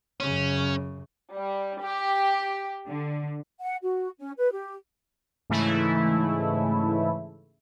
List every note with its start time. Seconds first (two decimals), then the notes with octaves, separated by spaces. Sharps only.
0.20 F#2 C#3 C#4
1.34 G3
1.83 G4
2.88 D3
3.61 F#5
3.82 F#4
4.19 C#4
4.37 B4
4.52 G4
5.50 G#2 C#3 E3 A3 E4